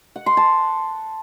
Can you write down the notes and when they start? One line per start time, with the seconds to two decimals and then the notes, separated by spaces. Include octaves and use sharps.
0.16 F#5
0.26 C6
0.37 A5